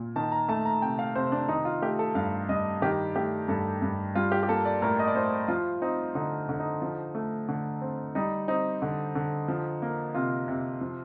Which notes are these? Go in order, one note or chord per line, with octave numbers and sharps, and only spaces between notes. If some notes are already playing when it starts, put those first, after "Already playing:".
Already playing: A#2
D#3 A5
A#5
A3 A5
A#5
C3 G5
F5
C3 C5
D4
D#3 D#4
F4
A3 G4
A4
G2 F5
G2 D#5
D#3 G4
A3 G4
G2 A4
G2
G3 F4
G4
G4
A#3 A4
D5
A2 A#4
D#5
D5
A2 C5
F3 F4
C4 D#4
D3 D#4
D3
D#4
F3
A3
D3
C4
G3 D#4
C4 D#4
D3
D3
F3
A#3
C3 F4
C3
F3